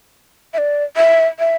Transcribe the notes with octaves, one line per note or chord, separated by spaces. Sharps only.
E5
D5
E5
E5